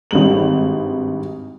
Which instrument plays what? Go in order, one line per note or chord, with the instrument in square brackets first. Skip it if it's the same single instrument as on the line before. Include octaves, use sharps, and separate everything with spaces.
[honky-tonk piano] G#1 G2 F#7